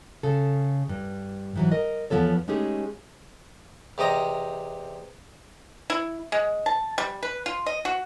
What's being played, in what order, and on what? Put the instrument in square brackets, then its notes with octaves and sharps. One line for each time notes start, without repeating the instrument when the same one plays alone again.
[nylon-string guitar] C#3 A4
G2
G#2 E3 F#3
A#4 D#5
E2 C3 F3 B3 A4 C#5
G#3 A3 C#4 D#4 G4 G#4
[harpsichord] E2 C3 G4 D#5 A#5
[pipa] E4
G#3
A5
G3
B4
F4
D#5
F#4